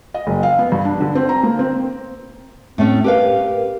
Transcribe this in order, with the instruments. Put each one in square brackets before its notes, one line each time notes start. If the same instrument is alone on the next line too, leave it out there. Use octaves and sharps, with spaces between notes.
[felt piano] D#5
F#1
F5
B3
G2
D4
D3
C4
A#5
A#3
C4
[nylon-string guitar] A2 A3 C#4 [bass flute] C4
[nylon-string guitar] G4 B4 F5 [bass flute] A#4